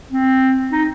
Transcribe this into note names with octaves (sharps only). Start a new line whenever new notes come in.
C4
D#4